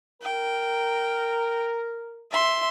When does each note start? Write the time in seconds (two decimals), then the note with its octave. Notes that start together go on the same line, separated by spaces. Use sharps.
0.22 A#4 G5
2.31 E5 C6